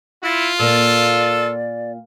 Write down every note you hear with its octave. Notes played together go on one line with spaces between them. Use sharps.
E4 F4
A#2 A#3 A4 D5